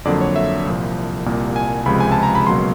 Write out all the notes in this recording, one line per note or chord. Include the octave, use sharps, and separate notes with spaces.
F2 D3 F#3 A#3 D5
C#5
E5
C2 A#2 F3
C2 A#2 G3 A#3
G#5
C#2 C3 F3 G#3 B5
G#5
A5
A#5
B5
C#2 B2 F#3 A#3 C6